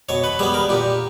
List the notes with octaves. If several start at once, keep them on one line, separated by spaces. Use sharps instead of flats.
B2 C#5
B4
G3 B3 G#4
A#4
A#2 G4